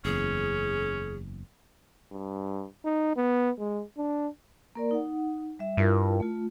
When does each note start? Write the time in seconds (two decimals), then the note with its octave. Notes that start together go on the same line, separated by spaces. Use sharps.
0.05 F#1 E2 C#4 G#4
2.12 G2
2.85 D#4
3.16 B3
3.59 G#3
3.98 D4
4.75 A#3 A#4 D5
4.91 D#4 F#5
5.59 G3 E5
5.77 G2 E4 F4 A#4
6.20 A3 F4